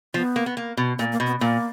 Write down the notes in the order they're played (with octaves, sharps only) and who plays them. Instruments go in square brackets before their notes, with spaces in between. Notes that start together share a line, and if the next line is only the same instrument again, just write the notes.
[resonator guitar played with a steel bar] F3 [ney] B3
[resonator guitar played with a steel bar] A#3
B3
A#3
B2
[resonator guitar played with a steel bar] A#2 [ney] A#3
[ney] A#3
[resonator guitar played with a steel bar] B2
[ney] B3
[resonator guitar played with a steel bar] A#2 [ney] A#3